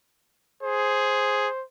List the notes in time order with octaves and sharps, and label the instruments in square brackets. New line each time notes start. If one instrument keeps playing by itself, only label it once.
[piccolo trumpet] G#4 [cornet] C5